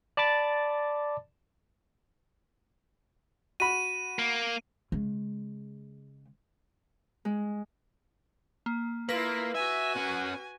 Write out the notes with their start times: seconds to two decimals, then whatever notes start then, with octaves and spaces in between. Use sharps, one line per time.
0.17 D5 A5 B5 D6 A6
3.60 F#4 B5 D#7
4.19 A#3
4.92 C#3 G#3
7.25 G#3
8.66 A#3
9.09 A#3 E4 F4 B4 A#6 B6
9.55 F#4 E5 G#5
9.97 C#4 F#5